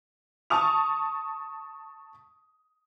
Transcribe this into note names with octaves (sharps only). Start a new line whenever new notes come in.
A5 C#6 D#6 F7